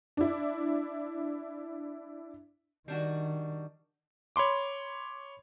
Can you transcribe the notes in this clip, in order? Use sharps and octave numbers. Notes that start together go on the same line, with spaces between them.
D4 E4
D#3 G3 D4 F#4
C#5 B5 C6 D6